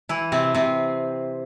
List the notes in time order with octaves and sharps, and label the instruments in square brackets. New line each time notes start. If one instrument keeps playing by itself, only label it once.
[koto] E3 E4
C3 C4
C3 C4